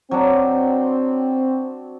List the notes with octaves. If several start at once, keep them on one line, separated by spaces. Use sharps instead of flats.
F#3 C4 D4